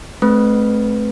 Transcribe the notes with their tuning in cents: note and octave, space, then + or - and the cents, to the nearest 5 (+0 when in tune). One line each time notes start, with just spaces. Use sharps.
A3 -30 C4 +15 B4 +0